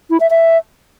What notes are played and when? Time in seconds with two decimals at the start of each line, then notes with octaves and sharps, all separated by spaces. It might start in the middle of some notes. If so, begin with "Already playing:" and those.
0.10 E4
0.20 E5
0.30 E5